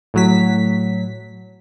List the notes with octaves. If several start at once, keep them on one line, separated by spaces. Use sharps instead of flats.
A2 F#3 B6